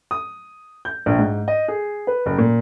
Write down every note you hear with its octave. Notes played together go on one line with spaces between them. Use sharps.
D#6
G6
A#1
G#2
D#5
G#4
B4
F#1
A#2